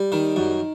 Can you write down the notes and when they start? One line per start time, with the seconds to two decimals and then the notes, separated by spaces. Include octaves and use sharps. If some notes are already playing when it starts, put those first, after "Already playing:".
Already playing: G3
0.12 D#3
0.36 F#2